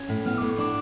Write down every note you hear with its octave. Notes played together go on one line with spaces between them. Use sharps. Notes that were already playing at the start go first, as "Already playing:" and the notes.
Already playing: C#4
A2
B3 F6
A2 D6
C#6
D4 D6